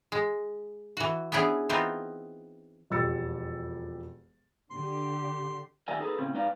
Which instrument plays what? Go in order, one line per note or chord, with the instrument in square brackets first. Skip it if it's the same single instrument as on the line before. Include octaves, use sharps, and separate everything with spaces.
[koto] G#3
E3 F#4
B3 C#4 D4 E4 G#4
E3 B3 C4 D#4 F4
[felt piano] E1 F2 G4 E6 A6 C#7
[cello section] D3 G4 [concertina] C6
[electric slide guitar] D#3 G4 A#4 D5 E5 G#5
D#4 G#4 A4 B4
A2 C#3 C4 C#4
G#3 D#4 B4 D5 F5